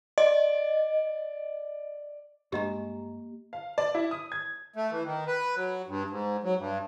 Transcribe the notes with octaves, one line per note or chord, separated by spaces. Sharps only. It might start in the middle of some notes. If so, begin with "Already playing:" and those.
D5 D#5
G2 G#3 A#3 G4 D#5 A#5
F5
D5
E4
D#6
G#6
A3
E3
D#3
B4
F#3
G2
G#2
F#3
G2